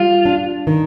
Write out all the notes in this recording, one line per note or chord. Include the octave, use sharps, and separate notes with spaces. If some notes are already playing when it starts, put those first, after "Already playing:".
Already playing: G3 F4
D4
D#3